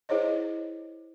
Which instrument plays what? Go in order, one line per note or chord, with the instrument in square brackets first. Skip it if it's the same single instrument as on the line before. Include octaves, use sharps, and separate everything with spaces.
[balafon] E4 G#4 C5 C#5 D#5